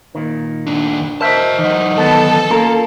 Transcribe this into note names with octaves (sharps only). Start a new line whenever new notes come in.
A#2 D#3
D#2 D4
A#4 C5 D#5 E5 A5
E3 F#3 D#4
D#3 B3 A4 B4
A#3 C#4 F4 A#5